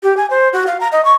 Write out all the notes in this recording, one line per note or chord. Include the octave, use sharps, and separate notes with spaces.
G4
G#5
C5
F#4
F5
A#5
D#5
C#6